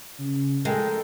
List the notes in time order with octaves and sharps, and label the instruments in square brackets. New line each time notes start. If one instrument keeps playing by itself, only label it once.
[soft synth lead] C#3
[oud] G#3 [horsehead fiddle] A4 G5 [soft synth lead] A#4